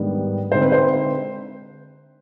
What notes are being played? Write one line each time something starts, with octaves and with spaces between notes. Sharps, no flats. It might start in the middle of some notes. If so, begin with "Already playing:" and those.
Already playing: G#2 D#3 G3 B3 D4
D3 G#3 C4 D#4 C5
B4
C5